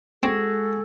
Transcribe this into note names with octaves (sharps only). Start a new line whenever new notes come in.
G#3 C4 F#4 G#4 A4